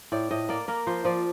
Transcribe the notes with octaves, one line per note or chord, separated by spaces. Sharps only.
A2 D5
A2 D#5
A#3 D5
A#3 A#4
F3 C5
F3 D5